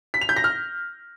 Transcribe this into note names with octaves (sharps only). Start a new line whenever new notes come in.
B6
F7
G6
A#6
F6